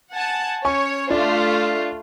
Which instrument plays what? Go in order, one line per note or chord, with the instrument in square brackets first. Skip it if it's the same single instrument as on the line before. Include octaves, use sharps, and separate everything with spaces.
[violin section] F#5 G#5 A5
[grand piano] C#4 G#5 C#6 [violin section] C#5
[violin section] A3 F4 [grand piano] D4